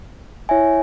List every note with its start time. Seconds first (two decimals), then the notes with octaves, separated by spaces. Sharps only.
0.49 E4 C#5 E5 G#5